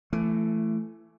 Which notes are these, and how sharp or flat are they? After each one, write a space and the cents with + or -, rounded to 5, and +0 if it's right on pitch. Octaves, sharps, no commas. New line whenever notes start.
E3 +25 A3 +0